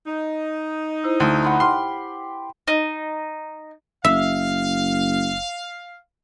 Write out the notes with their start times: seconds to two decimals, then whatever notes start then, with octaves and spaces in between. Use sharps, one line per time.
0.07 D#4
1.04 E4 C5
1.20 D2
1.43 F#5 B5 C6
1.60 G4 C6 F6
2.68 D#4
4.05 F#1 E5 F5